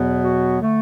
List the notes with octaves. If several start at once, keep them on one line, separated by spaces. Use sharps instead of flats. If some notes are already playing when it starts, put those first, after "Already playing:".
Already playing: E2 B2 F#3 B3
F#4
D3 A3